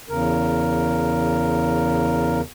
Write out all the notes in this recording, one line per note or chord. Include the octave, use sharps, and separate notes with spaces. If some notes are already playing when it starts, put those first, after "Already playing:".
E2 C#3 A#4